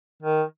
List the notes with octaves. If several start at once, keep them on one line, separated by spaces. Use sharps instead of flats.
D#3